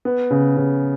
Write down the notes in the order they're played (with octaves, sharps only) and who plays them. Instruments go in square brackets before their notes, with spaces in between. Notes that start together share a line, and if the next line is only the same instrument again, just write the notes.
[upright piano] B3
C#3
C#3